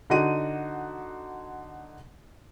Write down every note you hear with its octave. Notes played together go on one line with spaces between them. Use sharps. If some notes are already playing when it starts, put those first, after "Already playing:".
D3 D#4 F#4 D#7